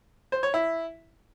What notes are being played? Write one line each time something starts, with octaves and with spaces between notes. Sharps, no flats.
C5
C#5
E4